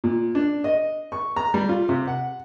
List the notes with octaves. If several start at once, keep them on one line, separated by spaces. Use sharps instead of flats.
A#2
D4
D#5
C#6
A#5
G3
F4
C3
F#5